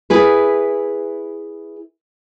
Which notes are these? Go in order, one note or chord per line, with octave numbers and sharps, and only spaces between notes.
E4 G#4 B4